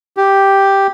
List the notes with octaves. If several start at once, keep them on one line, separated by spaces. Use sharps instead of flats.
G4